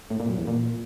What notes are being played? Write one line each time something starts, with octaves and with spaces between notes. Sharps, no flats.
A2
A#2
F#2
E2
A#2